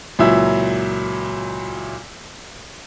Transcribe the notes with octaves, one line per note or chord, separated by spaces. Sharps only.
C#2 A#2 F#3 E4 E6